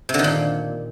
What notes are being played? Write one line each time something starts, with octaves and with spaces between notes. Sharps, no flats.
C3
D3
D#3
A#2